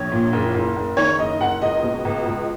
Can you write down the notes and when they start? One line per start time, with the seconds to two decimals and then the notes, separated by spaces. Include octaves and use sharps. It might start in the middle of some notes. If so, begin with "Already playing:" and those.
Already playing: A#1 C#5
0.12 A#2
0.33 F#1
0.54 F#1
0.76 F#1
0.97 D#3 C#5
1.19 F#1 D#5
1.41 F#1 F#5
1.62 C#2 D#5
1.83 B2
2.05 C#2
2.25 C#2